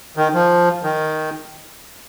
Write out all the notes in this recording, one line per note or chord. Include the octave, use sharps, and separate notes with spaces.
D#3
F3
D#3